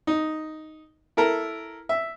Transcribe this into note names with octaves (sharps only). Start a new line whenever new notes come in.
D#4
E4 A4 A#4
E5